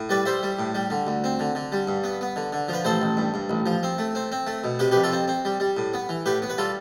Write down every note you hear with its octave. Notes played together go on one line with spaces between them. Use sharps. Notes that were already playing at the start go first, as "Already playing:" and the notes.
Already playing: A2
G3 B4 D5
G3 C5 E5
G3
A2
G3
D3
D2
C4
D3
D3
G3
G2
B3
B3
D3
D3
F3 B4
A1 A4 C5
A1
G2
G2
A1
F3
C4
A3
C4
C4
A3
B2
C3 G4 B4
G4 B4
F2
F4 A4
C4
C4
G3
G3
A2
B3
E3
A2 G4 B4
B3
B4
G3 F4 A4